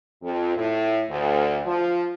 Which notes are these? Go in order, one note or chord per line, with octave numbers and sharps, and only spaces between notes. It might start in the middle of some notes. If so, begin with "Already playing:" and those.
F2
A2
D2
F3